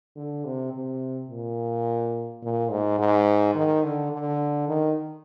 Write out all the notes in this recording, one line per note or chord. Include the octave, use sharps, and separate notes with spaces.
D3
C3
C3
A#2
A#2
G#2
G#2
D#3
D3
D3
D#3